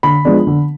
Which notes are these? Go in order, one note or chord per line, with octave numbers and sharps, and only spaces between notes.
D3 B5
F3 G#3 B3 D4
D3